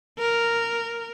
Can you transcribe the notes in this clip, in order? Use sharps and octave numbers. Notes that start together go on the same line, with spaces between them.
A#4